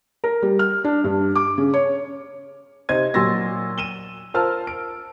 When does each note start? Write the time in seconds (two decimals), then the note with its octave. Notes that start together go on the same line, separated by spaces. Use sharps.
0.24 A#4
0.42 G3
0.59 F6
0.84 D4
1.04 G2
1.35 D6
1.58 C#3
1.74 C#5
2.89 C3 D#4 C5 G#6 D#7
3.14 A#2 F#3 C6 E6 A6 A#6
3.78 D#7 E7 G7
4.34 F4 A#4 C5 A5 E6 F6
4.67 D7